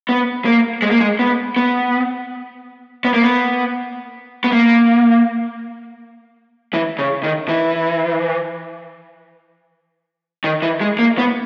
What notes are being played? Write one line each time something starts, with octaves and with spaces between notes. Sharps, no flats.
B3
A#3
G#3
A#3
G#3
B3
B3
B3
A#3
B3
B3
A#3
E3
C#3
D#3
E3
D#3
E3
G#3
A#3
B3